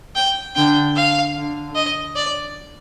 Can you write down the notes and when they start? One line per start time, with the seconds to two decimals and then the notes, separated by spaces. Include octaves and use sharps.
0.15 G5
0.55 D3 G5
0.96 F5
1.35 D3
1.75 D#5
2.16 D5